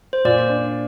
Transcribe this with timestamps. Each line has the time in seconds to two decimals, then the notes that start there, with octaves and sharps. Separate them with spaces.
0.13 C5
0.25 A#2 D5
0.49 D4